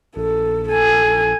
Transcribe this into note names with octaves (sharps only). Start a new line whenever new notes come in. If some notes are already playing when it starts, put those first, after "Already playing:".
A#1 A4
A4 G#5